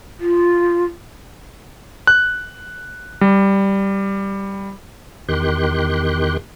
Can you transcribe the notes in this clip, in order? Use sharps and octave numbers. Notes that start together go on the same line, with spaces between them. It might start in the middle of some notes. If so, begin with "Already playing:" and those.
F4
F#6
G3
E2 D#3 G4 C6 F#6